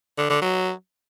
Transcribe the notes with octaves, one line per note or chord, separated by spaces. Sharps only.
D3
D3
F#3